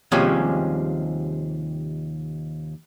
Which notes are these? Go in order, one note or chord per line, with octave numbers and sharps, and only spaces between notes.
D#2 C3 F3 G3 G#3 C#4